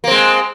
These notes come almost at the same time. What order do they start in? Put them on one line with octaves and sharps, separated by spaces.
A#3 C4 G#3